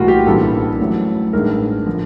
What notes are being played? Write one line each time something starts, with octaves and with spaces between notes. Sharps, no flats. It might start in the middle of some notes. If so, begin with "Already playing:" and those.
Already playing: B1 A2 E3 G3 A#3 F4 F#4
G4
A1 G2 E3 G3 A#3 A4
A1 A2 F#3
A1 G2 D#3 G#3 A#4
D3 F3